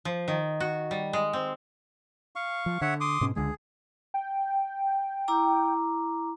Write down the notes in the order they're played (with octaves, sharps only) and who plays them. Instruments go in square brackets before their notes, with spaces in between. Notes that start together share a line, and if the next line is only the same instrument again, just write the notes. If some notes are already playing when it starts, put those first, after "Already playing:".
[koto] F3
D#3
F#4
G3
G#3
C4
[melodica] F5 C#6
[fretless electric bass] F3
[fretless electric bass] D3 [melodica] C#5 E5 F#5
[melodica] C6 D6 D#6
[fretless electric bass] G#2 B2 C#4
[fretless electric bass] C#2 D3 G#3 [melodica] G#4
[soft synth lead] G5
[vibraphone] E4 A#5 D6